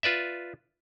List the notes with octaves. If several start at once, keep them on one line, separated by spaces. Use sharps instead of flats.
F4 B4 D5 E5